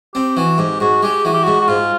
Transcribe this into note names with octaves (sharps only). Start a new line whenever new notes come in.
C4 G4
E3 F#4
G#2 G4
G#2 F#4
G#3 G4
E3 F#4
G4
G#2 F#4
F#4
G#2 F4